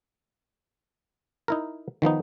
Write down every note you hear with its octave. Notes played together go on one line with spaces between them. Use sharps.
D#4 E4 A#4
D#3 F3 B3 D#4